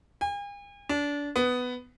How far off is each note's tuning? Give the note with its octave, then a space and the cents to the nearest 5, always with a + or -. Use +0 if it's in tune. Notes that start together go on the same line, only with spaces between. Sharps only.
G#5 -45
D4 -25
B3 +10